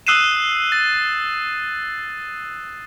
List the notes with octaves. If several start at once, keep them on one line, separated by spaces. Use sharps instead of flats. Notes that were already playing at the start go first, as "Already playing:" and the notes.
D#6 E6 F#6 C7 D#7 E7
A6